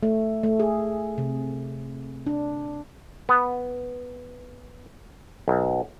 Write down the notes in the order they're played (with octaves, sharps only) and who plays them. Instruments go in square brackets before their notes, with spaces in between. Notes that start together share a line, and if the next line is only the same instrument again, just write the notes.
[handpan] A3
A3
G#4
C3
D4
[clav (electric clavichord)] B3
B1